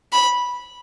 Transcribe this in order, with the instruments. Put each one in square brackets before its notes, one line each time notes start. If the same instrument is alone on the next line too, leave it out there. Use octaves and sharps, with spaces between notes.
[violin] B5